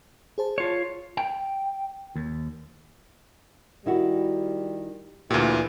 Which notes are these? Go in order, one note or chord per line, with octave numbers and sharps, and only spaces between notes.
G#4 C5 A5
F4 C#5
G5
D#2
D#3 G3 E4 F#4
D2 A#2 E3 G4